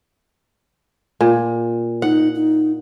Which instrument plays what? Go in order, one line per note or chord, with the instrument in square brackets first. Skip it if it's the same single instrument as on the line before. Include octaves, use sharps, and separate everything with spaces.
[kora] A#2
[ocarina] D#4 [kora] F#5
[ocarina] D#4